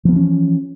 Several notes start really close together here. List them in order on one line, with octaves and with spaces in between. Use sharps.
F3 B3 E3 C#4